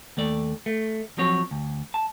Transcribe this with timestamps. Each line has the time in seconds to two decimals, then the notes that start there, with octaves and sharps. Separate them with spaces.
0.17 D#2 A3 D5
0.66 A3
1.18 F3 F#3 C4 F#4 C#5
1.51 D2
1.94 A5